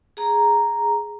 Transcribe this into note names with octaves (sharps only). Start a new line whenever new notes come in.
G#4 A#5